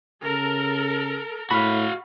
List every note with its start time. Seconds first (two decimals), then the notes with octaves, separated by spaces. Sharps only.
0.24 C#3 A4 A#4
1.51 A2 F#4 F5 B5